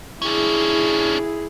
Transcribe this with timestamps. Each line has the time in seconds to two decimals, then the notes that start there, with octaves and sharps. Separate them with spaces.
0.22 C#4 D4 E4 G#4